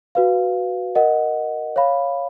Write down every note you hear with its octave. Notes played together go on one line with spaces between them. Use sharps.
F#4 B4 F5
A#4 D#5 F#5
C#5 F5 B5